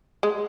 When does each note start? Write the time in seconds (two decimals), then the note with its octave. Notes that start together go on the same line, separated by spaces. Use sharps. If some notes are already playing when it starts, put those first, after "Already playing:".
0.23 G#3